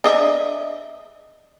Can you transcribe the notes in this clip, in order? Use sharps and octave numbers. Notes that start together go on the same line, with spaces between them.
D4 D#5 E5